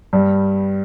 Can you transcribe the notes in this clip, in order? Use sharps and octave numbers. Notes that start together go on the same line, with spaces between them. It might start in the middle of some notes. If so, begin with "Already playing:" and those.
G2 G3